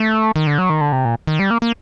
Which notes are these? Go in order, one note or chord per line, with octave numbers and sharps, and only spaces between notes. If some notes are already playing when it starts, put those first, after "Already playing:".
Already playing: A3
D#3
D3
F#3
D#3
D3
C3
A#2
D#3
G3
A#3
A#3